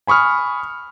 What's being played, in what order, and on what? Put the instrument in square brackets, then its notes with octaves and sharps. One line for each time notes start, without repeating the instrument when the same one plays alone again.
[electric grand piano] G#5 B5 C#6 D#6 F6